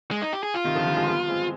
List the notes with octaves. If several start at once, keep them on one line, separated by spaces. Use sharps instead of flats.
G#3
D#4
G4
G#4
F4
C3 D#3
D3 F3
D#3 G3
F3 G#3
G3 B3
G#3 C4